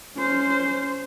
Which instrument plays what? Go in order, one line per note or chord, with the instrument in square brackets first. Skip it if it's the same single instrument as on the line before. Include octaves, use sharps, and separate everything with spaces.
[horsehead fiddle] C#4 C5